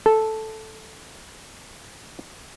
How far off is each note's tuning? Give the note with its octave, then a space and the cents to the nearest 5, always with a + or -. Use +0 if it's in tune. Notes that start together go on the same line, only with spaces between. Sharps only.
A4 -5